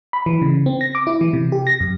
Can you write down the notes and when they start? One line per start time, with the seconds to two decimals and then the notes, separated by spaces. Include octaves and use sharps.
0.13 B5
0.26 E3
0.42 C#3
0.66 C4
0.81 A#6
0.95 D6
1.07 E4
1.21 E3
1.33 C3
1.52 G4
1.67 A#6
1.80 F#2